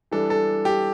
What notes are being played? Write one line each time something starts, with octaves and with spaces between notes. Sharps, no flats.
E3 G3 D4 A4
A4
G4